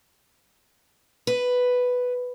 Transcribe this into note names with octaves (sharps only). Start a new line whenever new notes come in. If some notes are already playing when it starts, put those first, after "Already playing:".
B4